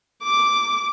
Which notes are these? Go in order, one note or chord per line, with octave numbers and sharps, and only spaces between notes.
D6